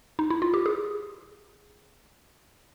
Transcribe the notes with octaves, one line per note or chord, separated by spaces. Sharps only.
D#4
E4
F4
G4
G#4